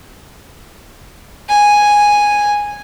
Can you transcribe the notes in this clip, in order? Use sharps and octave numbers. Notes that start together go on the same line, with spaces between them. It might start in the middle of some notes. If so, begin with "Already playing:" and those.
G#5